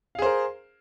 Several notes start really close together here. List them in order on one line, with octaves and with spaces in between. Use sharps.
F5 G#4 C5 A#4